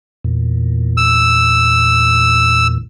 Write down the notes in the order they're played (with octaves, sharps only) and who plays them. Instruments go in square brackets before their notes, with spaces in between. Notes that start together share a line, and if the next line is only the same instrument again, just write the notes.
[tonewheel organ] E2 A#2
[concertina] E6